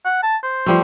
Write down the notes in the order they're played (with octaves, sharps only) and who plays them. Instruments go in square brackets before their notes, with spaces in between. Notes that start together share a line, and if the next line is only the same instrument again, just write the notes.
[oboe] F#5
A5
C5
[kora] F3 G3 A3